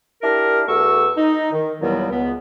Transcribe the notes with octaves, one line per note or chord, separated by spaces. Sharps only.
D4 E4 G4 A#4
E2 A3 F#4 C#6 E6
D#4
D#3
D#2 A#2 E3 F#3 G3 B3
C#2 B3